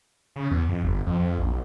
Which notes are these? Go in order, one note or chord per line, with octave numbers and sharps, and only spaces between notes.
C#3
E2
F2
G1
F2
F2
A#1
B1